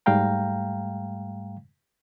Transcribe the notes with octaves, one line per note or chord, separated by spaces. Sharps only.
G#2 G3 A3 F5 G5 A#5